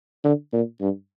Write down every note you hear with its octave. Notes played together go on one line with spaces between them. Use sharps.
D3
A#2
G2